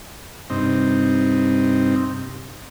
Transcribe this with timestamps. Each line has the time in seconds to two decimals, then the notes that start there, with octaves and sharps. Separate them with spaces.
0.50 G2 C3 C4 D#4